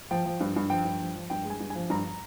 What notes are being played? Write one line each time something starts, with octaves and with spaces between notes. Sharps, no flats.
F3 G5
F3
G2
G2
F3 G5
G2
F3
F3
G2 G5
G#3
G#5
G2
G#5
F3
G2 A#5